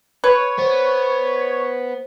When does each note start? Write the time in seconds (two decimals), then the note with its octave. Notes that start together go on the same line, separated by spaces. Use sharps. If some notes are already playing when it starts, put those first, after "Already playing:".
0.24 B4 C#5
0.58 B3 C5